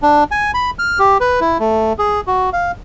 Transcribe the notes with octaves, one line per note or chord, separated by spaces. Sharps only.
D4
G#5
B5
F6
G4
B4
E4
A3
G#4
F#4
F5